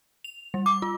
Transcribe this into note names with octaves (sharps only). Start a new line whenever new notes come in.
F7
G3
D6
F4